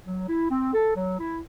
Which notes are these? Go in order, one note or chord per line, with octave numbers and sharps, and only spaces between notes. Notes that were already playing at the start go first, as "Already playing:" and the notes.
F#3
E4
C4
A4
F#3
E4